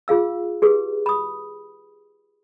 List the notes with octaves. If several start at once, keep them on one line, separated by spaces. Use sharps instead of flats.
F4 G#4 F5 E6
G4 G#4 B4
B5 D#6